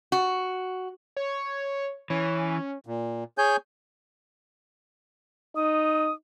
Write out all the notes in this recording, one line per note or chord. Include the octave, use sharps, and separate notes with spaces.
F#4
C#5
E3 C#4
A#2
G#4 C#5 G#5 G6
D#4 D#6